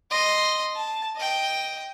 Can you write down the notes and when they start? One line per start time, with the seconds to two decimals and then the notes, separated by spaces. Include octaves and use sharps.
0.11 D#5 C6
0.75 A5
1.16 D#5 G5